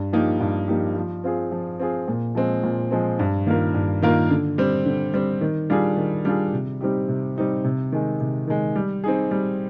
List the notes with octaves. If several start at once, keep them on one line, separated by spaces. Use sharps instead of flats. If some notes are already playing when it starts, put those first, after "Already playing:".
Already playing: G2
F3 A#3 D#4 G4
G2
F3 A#3 D#4 G4
F3
C4 F4 G#4
F3
C4 F4 G#4
A#2
F3 G#3 C4
A#2
F3 G#3 C4
G2
D#3 A#3 F4 A#4
G2
D#3 A#3 F4 A#4
D3
G3 C4
D3
G3 C4
D#3
G3 D4 F4 G#4
D#3
G3 D4 F4 G#4
C3
G3 C4 D#4 G4
C3
G3 C4 D#4 G4
C3
D#3 G#3
C3
D#3 G#3
G3
C4 D#4 G#4
G3